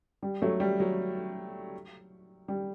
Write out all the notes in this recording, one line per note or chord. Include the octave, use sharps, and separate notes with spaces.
G3
F#3 A3
G3
F#3
G3